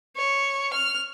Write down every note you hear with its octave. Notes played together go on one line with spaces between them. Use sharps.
C#5
F6